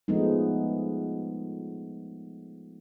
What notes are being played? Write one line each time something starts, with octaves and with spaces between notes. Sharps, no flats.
F3 G#3 A3 B3 D#4